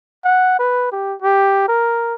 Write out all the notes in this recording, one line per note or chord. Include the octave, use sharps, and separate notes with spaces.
F#5
B4
G4
G4
A#4